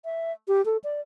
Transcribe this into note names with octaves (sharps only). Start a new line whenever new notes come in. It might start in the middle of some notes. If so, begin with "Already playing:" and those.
E5
G4
A4
D5